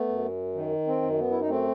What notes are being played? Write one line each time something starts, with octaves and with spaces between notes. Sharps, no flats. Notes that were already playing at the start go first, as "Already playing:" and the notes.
Already playing: A3 B3
F#2
D#3
C4
F#2
B3
E4
D#4
A3 C4